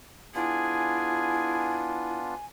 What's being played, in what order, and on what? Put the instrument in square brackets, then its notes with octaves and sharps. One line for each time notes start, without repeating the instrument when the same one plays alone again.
[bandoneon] B3 D4 F4 [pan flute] E4 [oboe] G#4 [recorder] G#5